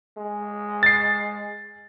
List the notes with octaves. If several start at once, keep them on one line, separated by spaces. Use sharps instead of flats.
G#3
A6 C7